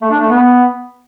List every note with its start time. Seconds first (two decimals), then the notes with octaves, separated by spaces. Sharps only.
0.02 A3
0.11 D4
0.20 A3
0.29 B3